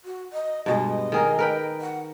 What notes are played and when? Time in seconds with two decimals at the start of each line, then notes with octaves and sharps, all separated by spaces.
0.04 F#4
0.33 D#5
0.66 G2 B2 G#3 D#5
1.12 D#3 G#4 A#4
1.39 A#4 B4 G5
1.81 F#5